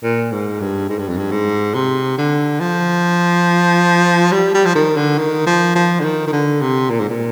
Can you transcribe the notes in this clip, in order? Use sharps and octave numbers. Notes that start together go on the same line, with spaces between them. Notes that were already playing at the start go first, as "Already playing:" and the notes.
A#2
G#2
G2
G#2
G2
F2
G2
G#2
C3
D3
F3
G3
G3
F3
D#3
D3
D#3
F3
F3
D3
D#3
D#3
D3
C3
A#2
G#2
A#2